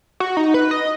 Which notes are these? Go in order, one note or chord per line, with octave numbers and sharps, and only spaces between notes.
F#4
D#4
B4
D#5